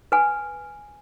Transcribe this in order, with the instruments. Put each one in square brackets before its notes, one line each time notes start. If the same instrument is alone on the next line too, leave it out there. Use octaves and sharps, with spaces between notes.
[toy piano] B4 G#5